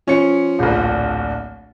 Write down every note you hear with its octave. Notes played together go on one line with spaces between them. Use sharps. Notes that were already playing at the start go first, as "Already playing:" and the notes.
F3 C#4 C#7
D1 A#1